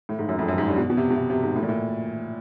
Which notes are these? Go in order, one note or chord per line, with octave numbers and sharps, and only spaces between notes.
A2
G#2
F#2
F2
F#2
G#2
G2
B2
B2
C3
B2
C3
C3
G#2
A2
A#2
A2